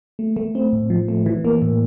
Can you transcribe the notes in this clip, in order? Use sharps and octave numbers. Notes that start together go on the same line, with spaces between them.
A3
A3
C4
A2
F3
A3
E3
A#3
A2